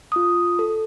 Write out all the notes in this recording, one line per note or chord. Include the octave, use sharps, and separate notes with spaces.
F4 D#6
A4